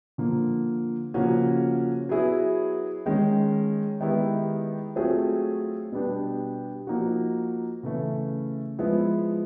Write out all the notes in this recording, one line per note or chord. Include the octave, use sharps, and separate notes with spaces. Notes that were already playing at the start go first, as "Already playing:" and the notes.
D3 F3 A#3
C#3 F3 A#3 C#4 F#4
F#3 B3 E4 G#4
D#3 G#3 C#4
D#3 G#3 B3 E4 G4
F#3 A3 C4 F4 G#4
B2 G3 B3 D4 G4
F3 A#3 D#4 F#4
C#3 E3 A3 C#4
F3 G#3 B3 E4